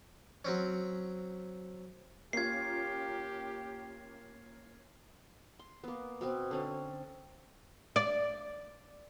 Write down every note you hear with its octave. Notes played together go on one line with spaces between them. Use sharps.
F#3 C4 C#4
A#3 C#4 F4 G4 G#6 C7
C6
A#3 B3
B2 B3 C4
D3 C4 C#4
D5